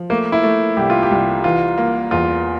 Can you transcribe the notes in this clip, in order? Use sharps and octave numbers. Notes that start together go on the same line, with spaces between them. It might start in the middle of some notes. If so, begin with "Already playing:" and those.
Already playing: F3
A3 A#3
E4
A3
C2 G4
F4
G4
C2
E3 F4
A#3
E2 F4